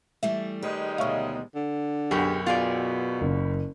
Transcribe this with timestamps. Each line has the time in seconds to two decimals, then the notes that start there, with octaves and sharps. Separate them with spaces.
0.23 E3 G3 A3 E5
0.63 D#3 G3 G#3 B4
0.98 D2 B2 C#5 E5 F5
1.55 D3
2.11 B1 F#2 G4 G#4
2.46 B2 F4 G#4 D5
3.21 F#1